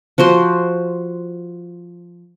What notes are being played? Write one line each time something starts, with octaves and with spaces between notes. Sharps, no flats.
F3 F#4 C5 C6